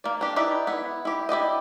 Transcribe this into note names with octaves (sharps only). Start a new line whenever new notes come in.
A#3 D5
D4 G4
D#4 E4 G4 B4 D5
B3 E4
E4 G4
E4 G4 D5 D#5